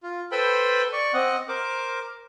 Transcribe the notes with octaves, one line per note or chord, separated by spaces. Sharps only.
F4
A4 B4 C5 G5 B5 C6
D5 C#6
C4 D#5 F#5
A#4 C5 D6